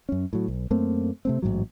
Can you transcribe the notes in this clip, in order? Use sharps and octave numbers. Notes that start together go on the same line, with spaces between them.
F#2 C#4
A2 F#3
B1
F#2 A3 A#3 C4
C3 A3 C4
A1 G#2 E3 F#3